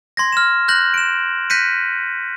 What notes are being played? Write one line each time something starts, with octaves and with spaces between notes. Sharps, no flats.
C6 G#6 A#6
F6 E7
F#6 G6 A#6 F#7
D7 E7
F#6 G6 A#6 B6 C#7 D#7